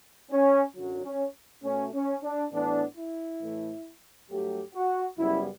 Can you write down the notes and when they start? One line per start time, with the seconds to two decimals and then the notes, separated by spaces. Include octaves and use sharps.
0.32 C#4
0.76 F#2 D3 F#3
1.05 C#4
1.64 B2 A3 C#4
1.94 C#4
2.24 D4
2.52 A2 E3 B3 D4
2.97 E4
3.41 A2 E3 A3
4.30 G2 F#3 A3 G4
4.74 F#4
5.18 F#2 C#3 G3 B3 E4